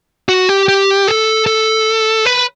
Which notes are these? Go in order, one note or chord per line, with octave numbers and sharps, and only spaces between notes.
F#4
G4
G4
A4
A4
B4